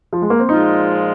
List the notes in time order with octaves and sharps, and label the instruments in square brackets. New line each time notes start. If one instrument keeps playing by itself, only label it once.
[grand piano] F3
G#3
A#3
C4
[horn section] A#2 F3 G#3 F4 [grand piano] D#4